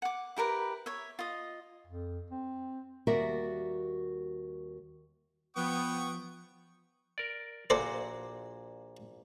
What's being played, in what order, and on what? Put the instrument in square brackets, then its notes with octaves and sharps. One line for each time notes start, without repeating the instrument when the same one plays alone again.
[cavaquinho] F#5 D6
E4 G4 A#4 B4
C#5 E5
F4 D#5
[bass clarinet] F2
C4
[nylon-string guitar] D#2 G3 F#4 A#4 D5 E5
[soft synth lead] F3 [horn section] B3 [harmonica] G5 C#6 D#6
[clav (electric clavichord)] A#4 D5
[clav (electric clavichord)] A#1 A#2 F#4 [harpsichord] A4 C5 D5